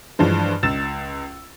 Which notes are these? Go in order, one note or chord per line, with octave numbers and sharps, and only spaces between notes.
G2 E3 F3 G#3
C#2 E6 A6 E7